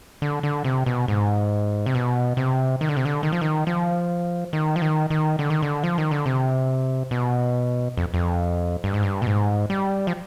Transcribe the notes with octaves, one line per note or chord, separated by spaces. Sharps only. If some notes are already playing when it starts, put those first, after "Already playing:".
D3
D3
C3
B2
G#2
C3
B2
C3
D#3
D3
C3
D3
D#3
F3
D#3
F3
D#3
F3
D#3
D#3
D3
D#3
D3
F3
D#3
D3
C3
B2
F2
F2
G2
G#2
G2
B2
G#2
G3
F3